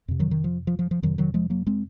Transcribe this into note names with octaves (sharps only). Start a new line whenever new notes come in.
F2 C3
D#3 F#3
D#3
F3
F3
F3
F3
F2 C3 D#3 F#3
D#3 F#3
F3 G#3
F#3 A#3
G#3 C4